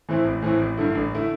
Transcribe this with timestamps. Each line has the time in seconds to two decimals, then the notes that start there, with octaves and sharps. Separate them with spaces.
0.09 A2 E3 C4 E4
0.25 A1
0.42 A2 E3 C4 E4
0.59 A1
0.77 G2 D3 A3 E4
0.95 A1
1.13 D3 A3 E4